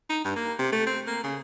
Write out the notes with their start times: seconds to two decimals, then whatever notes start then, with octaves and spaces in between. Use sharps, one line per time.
0.10 D#4
0.24 G2
0.36 A#3
0.59 C3
0.73 A3
0.87 C4
1.07 A#3
1.24 C#3